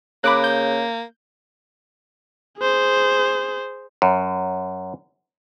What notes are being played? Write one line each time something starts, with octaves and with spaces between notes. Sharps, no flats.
C#3 A#3 B5 D6 F#6
G6
G#4 C5
F#2